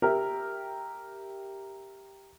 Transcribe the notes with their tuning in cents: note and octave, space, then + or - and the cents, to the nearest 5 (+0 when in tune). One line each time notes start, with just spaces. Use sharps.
G4 +0 A#4 +0 E5 +0